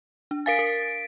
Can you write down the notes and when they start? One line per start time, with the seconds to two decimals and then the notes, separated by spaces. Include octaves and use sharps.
0.31 D4
0.46 A#4 F5 G#5 A6 B6 D7
0.59 A#4